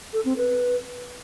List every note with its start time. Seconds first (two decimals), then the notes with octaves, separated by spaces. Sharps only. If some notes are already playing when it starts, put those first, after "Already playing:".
0.13 A4
0.25 C4
0.37 B4